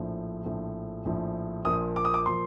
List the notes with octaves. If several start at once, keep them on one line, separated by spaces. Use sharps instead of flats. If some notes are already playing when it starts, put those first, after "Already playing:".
Already playing: A#1 A2 F3
A#1 A2 F3
A#1 A2 F3
A#1 A#2 F3 D#6
D6
D#6
D6
A#2 F3 C6